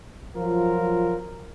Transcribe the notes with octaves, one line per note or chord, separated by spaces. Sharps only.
F3 F#3 F4 A#4